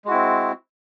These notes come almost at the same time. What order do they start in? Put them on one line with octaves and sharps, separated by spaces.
G#3 F#4 E4 C4